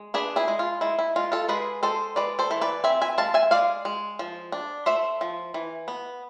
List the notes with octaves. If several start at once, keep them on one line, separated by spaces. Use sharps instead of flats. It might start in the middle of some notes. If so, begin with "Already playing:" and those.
Already playing: G#3
D4 G#4 B4
E4 G#4
G#3
F4
G#3 E4
E4
G#3 F4
F4 A4
G#3 G#4 B4
G#3 A4 C5
G#3 B4 D5
A4 C5
E3
B4 D5
C4 E5 G#5
E5 G#5
G#3 F5 A5
E5 G#5
G#3 D5 F5
G#3
F3
D4
A3 C5 E5
F3
E3
B3